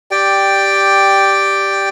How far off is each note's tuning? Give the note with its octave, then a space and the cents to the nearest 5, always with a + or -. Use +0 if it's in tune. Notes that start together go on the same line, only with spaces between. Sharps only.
G4 +0 D5 +0 G5 +0